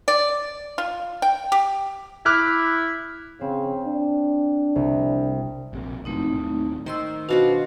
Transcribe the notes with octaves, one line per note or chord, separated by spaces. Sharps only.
D5
F4
G5
G4
E4 D6 F6 F#6
C#3 C4
D4
C2
A#1 C3 A#3
F1 F#2 E3 A3 C4 D#4
D#2 A2
D#3 C5 D#5 C6 E6
B2 D4 F4 F#4 C5 F5